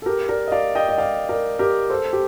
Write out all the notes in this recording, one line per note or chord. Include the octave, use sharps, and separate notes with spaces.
A4
G4 A#4
A#4 D5
D#5
D5 F5
D#5 G5
D#5
D5 F5
A#4 D5
G4 A#4
A4 C5
G4